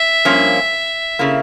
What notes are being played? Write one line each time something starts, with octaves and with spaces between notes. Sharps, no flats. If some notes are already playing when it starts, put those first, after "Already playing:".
Already playing: E5
G2 F3 A#3 C#4
C#3 A#3 E4